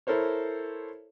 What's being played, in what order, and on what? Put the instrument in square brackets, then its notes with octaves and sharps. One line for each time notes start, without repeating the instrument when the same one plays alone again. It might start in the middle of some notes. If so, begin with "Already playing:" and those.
[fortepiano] E4 A4 A#4 C5 C#5